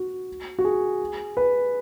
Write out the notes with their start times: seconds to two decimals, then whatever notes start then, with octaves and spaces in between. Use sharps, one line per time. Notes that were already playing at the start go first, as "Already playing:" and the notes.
Already playing: F#4
0.59 F#4
0.65 G#4
1.37 B4